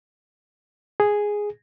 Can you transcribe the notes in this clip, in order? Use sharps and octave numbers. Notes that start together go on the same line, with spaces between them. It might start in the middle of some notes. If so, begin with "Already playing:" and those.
G#4